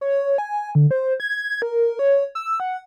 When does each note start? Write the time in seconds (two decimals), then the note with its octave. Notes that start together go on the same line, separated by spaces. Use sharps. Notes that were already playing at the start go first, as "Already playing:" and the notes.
0.01 C#5
0.38 G#5
0.75 D3
0.91 C5
1.20 G#6
1.62 A#4
1.99 C#5
2.35 E6
2.60 F#5